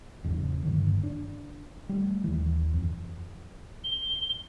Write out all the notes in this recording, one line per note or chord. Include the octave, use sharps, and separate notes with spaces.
E2 G#2 C#3 F#3
F#1 G2 D3 D#3
D4
G3 A3
D#2 E3
F2
G7